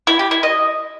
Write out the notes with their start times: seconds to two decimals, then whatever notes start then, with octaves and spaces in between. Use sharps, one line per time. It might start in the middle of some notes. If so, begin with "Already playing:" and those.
0.07 E4
0.19 G4
0.31 E4
0.43 D#5